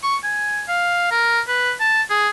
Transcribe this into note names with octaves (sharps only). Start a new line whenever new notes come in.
C#6
G#5
F5
A#4
B4
A5
G#4